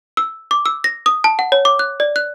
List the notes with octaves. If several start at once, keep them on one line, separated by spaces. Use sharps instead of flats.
E6
D6
E6
A#6
D#6
A5
F#5
C#5
D6
F#6
D5
F#6